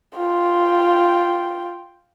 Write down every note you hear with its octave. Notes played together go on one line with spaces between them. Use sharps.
F4 G5